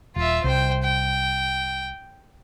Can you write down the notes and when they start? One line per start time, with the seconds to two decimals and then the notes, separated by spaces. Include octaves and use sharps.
0.16 D#1 F4 E5
0.44 C2 C5 G5
0.83 G5